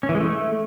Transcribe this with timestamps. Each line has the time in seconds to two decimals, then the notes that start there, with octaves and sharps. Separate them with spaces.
0.03 C#4
0.09 E3
0.15 G#3
0.21 A3